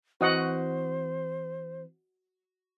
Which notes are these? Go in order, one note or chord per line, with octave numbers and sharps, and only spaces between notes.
E3 C4 F#4 C5 D#5 F#5